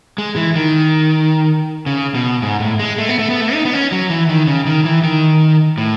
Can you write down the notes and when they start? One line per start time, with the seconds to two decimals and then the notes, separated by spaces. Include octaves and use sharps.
0.18 G#3
0.36 E3
0.56 D#3
1.86 C#3
2.15 B2
2.42 G#2
2.60 A2
2.79 G#3
2.98 A3
3.09 B3
3.19 A3
3.30 B3
3.40 A3
3.53 D#4
3.65 B3
3.73 C#4
3.92 F#3
4.10 E3
4.29 D#3
4.47 C#3
4.67 D#3
4.85 E3
5.04 D#3
5.78 A2